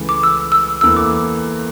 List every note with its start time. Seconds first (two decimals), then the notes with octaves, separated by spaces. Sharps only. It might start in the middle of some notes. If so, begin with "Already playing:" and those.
Already playing: C#2 C#3 E3 A3
0.09 D6
0.23 E6
0.52 E6
0.81 E2 E3 A#3 E4 A4 E6
0.96 D6